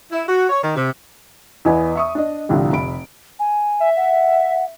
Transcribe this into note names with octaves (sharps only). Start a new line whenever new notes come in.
E4
F#4
C#5
D#3
C3
E2 B3 E4 D#5 G#5 B5
E5 C#6 D#6
D4 D#5
C2 A2 D3 F3 G3
F1 B5 D7
G#5
E5
F#5